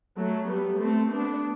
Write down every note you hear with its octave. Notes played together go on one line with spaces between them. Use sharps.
F#3 A3
G3 B3
A3 C4
B3 D4